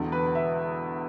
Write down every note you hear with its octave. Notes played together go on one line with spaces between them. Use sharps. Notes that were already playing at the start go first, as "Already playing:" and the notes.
Already playing: E1 E2 D3
B4
E5